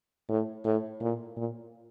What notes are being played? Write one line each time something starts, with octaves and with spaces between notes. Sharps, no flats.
A2
A2
A#2
A#2